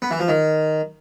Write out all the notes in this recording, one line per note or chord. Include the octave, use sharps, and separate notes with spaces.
B3
E3
F3
D#3